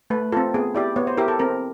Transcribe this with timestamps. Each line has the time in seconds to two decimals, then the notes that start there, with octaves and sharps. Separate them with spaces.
0.10 A3 B4
0.32 C4 F4 A4
0.54 B3 G#4
0.75 E4 G4 D5
0.96 B3 C#5
1.07 C5
1.17 E4 G4 A#4
1.28 A4
1.39 C4 A#4